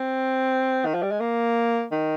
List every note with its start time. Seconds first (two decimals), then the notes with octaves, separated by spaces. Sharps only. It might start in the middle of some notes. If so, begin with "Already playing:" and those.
Already playing: C4
0.85 D#3
0.94 F3
1.02 G3
1.11 G#3
1.20 A#3
1.92 D#3